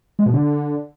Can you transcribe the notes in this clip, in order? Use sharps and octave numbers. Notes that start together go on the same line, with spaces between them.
G#3
B2
D3